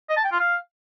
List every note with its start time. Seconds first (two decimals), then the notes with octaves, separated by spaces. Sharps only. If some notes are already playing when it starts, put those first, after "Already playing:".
0.10 D#5
0.17 A5
0.25 G5
0.32 F4
0.39 F5